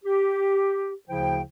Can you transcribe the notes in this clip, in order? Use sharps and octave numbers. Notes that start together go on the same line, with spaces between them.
G4
D2 C#3 F3 E4 C5 G5